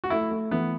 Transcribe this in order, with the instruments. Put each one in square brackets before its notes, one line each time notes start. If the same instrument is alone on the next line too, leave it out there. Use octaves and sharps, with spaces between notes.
[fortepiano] F#4
[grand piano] A3 [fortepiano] E4
[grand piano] A3
[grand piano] E3 [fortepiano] B3